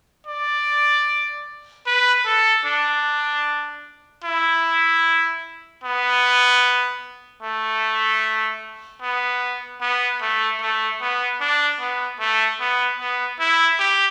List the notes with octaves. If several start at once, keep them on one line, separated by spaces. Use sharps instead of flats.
D5
B4
A4
D4
E4
B3
A3
B3
B3
A3
A3
B3
D4
B3
A3
B3
B3
E4
G4